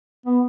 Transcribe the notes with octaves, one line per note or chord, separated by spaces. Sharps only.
B3